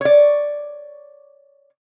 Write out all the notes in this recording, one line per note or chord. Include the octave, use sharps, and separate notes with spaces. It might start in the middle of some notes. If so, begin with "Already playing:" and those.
C#5 D5